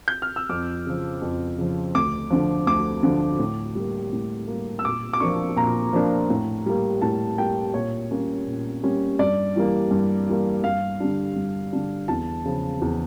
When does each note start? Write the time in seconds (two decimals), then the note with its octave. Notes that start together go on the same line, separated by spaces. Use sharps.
0.08 G6
0.22 F6
0.36 E6
0.49 F2 D6
0.86 C#3 F3
1.22 F2
1.58 C#3 F3
1.95 D2 D6
2.30 D3 F3
2.67 D2 D6
3.03 D3 F3
3.39 A2
3.75 G3 A#3
4.13 A2
4.48 A#3
4.53 G3
4.79 E6
4.85 A#2 D6
5.13 D6
5.20 F3 A#3 D4 C#6
5.56 A#2 A#5
5.93 F3 A#3 D4
6.30 A2
6.66 G3 A#3
7.02 A2 A5
7.37 G3 A#3 G5
7.74 A#2 C#5
8.11 G3 A#3 C#4
8.47 A#2
8.83 G3 A#3 C#4
9.19 G2 D5
9.56 E3 G3 A#3
9.91 G2
10.27 E3 G3 A#3
10.63 G2 F5
11.00 D3 G3 D4
11.36 G2
11.73 D3 G3 D4
12.08 E2 A5
12.45 C#3 F3
12.82 E2